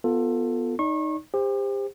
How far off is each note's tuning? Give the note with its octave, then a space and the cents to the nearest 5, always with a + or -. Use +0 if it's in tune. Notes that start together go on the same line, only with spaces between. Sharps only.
B3 +0 F4 +15 A4 +15
D#4 +0 D5 -35 C#6 -35
G4 +35 C5 +0